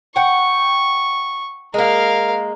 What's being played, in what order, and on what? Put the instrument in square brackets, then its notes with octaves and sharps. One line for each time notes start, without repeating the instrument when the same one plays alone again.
[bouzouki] F#5 G5 [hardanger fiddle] C#6
[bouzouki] G#3 A#3 [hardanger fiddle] A#4 F5